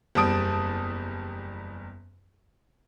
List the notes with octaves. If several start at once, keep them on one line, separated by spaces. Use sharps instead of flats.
F#1 E2 G3 A5 D#6 D7